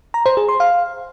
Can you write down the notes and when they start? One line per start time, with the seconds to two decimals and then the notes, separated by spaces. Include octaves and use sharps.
0.14 A#5
0.26 C5
0.37 G#4
0.49 C6
0.60 F5